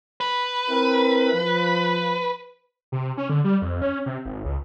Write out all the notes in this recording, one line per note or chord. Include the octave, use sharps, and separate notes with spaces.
B4
C4 E4 A#4
F3
C3
C#4
D3
G3
F2
C#4
C3
G#1
C#2